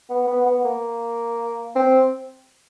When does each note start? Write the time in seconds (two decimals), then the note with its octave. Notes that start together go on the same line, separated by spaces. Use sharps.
0.10 B3
0.27 B3
0.46 B3
0.65 A#3
1.75 C4